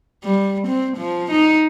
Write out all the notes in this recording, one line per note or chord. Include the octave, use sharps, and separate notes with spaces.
G3
C4
F3
D#4